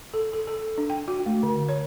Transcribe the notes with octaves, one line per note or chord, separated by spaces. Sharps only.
A4
A4
A4
D4
G5
F#4
A3
D3
C#5